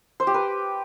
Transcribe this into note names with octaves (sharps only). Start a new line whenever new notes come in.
C5
G4
B4